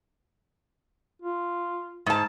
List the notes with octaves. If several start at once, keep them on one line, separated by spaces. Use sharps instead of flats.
F4
G#2 A5